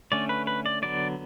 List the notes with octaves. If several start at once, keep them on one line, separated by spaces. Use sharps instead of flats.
D3 A3 C#4 D5
B4
B4
D5
D3 F#3 B3 D5